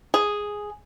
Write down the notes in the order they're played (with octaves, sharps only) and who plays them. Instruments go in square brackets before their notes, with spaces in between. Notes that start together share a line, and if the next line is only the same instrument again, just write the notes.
[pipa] G#4